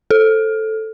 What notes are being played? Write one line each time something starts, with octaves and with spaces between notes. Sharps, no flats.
A4